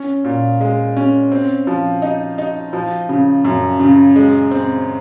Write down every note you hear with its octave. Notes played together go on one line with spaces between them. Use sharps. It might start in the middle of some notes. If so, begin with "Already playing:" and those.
Already playing: C#4
A#2
G#3
C#4
C4
F3
D#4
D#4
F3
C#3
F#2
C#3
G#3
C4